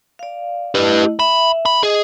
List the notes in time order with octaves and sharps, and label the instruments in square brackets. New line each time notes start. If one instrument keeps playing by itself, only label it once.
[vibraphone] D5 F5
[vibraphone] A3 E4 D#5 [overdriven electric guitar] G4 B4
[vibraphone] E5 [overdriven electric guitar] B5
[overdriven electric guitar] B5
[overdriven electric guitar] G#4 [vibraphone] D#5